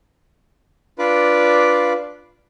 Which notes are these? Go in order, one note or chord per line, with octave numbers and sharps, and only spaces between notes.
D4 F4 B4 D5 D6